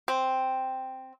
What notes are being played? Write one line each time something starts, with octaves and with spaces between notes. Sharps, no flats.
C4